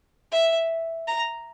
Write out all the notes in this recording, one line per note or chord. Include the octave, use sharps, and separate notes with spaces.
E5
A#5